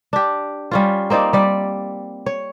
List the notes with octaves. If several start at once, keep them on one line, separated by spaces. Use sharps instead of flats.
D4 G4
G3 C#4 F4
A#3 C4 D#4 D5
G3 D5
C#5